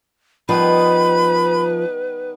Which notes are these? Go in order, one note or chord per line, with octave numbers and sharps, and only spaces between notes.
D#3 F3 G3 B3 B4 B5